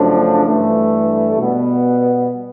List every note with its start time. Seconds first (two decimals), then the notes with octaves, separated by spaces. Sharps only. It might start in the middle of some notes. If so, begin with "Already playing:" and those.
Already playing: F#2 C#3 F3 A3 D4
0.47 G2 E3 A3
1.38 B2 G3 B3